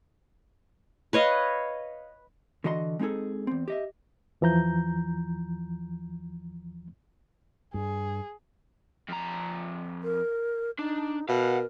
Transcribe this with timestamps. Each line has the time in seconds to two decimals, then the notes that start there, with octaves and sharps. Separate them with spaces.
1.13 B4 C#5 D#5 F5
2.64 D3 E3 F#4 D#5 A#5 C6
2.99 G#3 C4 D#4 G#4 A4
3.47 E2 C4
3.68 G4 D#5 E5
4.41 E2 E3 F3 A#5 G6
7.74 G2 G#4
9.08 F2 A#5
10.03 A#4
10.79 D4 D#4
11.29 B2 A#4 F5 F#5